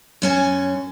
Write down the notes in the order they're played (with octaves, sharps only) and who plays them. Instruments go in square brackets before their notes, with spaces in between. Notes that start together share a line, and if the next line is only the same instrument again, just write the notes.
[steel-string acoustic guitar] F#2 C#4 G#5